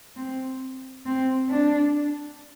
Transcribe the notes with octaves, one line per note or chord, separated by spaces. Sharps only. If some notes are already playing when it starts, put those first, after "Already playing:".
C4
C4
D4